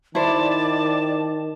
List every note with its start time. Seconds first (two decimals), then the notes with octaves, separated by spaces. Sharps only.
0.15 D#3 E4 C5 D5 A5 D6